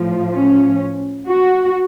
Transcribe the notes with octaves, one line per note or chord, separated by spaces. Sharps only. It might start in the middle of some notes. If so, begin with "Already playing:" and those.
Already playing: A2 F3
C#4
F#4